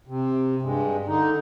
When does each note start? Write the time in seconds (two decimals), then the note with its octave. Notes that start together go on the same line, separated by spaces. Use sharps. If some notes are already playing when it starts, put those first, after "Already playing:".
0.07 C3
0.62 G2 G#3
1.07 D3 D#4